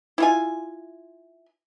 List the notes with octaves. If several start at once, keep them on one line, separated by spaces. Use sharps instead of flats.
E4 F4 G#5